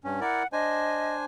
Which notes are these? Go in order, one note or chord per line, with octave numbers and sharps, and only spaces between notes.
G2 C#4
E4 A#4 D5 F#5
D4 C5 D#5 G#5